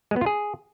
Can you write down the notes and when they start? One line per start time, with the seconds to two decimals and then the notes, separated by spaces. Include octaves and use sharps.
0.11 G#3
0.16 B3
0.21 F4
0.26 G#4